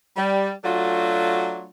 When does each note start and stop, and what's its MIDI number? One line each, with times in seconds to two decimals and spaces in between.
0.17 0.52 55
0.65 1.70 54
0.65 1.70 57
0.65 1.70 62
0.65 1.70 65
0.65 1.70 66